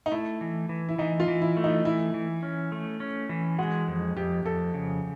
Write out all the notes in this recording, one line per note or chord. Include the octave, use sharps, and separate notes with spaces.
D#4
A3 E4
E3
E3
E4
E3 D#4
F4
E3
E4
A3
D#4
E3 E4
E3
C#4
A3
C#4
E3
G#3 F#4
F2
F2 G4
F2 A4
C#3